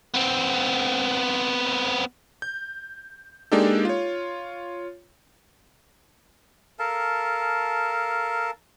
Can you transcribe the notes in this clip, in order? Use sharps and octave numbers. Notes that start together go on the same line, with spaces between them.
B3 C4
G6
G#3 A#3 D4 D#4 G4 A4
F4 C#5
A4 A#4 F5 A5